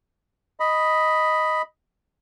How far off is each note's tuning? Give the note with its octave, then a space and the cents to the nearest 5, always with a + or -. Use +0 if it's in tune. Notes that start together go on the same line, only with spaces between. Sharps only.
D#5 +5 B5 +0